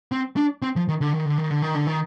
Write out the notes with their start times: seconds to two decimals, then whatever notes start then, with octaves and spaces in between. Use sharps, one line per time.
0.12 C4
0.37 D4
0.62 C4
0.76 F3
0.88 D#3
1.01 D3
1.13 D#3
1.26 D3
1.38 D#3
1.50 D3
1.62 D#3
1.75 D3
1.87 D#3